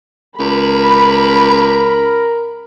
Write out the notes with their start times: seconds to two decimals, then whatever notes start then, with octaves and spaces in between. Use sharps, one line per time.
0.39 C#2 A#4 B5